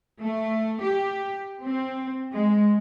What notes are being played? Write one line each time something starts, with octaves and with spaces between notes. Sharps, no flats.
A3
G4
C4
G#3